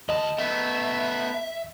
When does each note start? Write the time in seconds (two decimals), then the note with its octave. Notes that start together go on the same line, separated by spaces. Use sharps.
0.09 D2 D#5 A5
0.39 A3 B3 E5